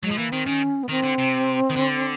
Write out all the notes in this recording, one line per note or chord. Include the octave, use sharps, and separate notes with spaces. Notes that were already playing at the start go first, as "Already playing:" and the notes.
F#3 G#3
F3
E3 A#3
D#3 C4
D#3 C#4
B3
D#3 C4
D3
C3
D#3
D3